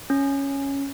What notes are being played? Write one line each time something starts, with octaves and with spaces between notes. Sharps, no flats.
C#4